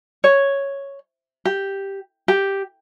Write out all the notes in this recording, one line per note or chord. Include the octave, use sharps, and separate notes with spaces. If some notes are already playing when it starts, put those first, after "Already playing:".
C#5
G4
G4